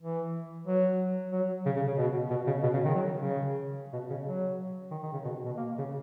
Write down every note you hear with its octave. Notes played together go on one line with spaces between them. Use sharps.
E3
F#3
F#3
C#3
C#3
C#3
B2
B2
C#3
B2
C#3
D#3
F#3
C#3
B2
C#3
F#3
D#3
D#3
C#3
B2
B2
A#3
C#3